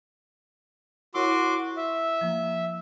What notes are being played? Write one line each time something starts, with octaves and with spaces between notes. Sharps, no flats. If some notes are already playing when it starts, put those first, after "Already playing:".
E4 F#4 A#4 C#5 C6 D6
E5
F3 A#3